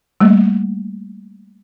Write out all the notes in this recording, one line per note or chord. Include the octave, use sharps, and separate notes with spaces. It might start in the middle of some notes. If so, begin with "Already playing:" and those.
G3 A3 A#3